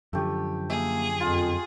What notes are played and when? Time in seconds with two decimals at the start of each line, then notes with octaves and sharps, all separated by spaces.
0.13 F#2 D3 F3 A3 G4
0.70 A#3 G#4 E5
1.20 F2 F4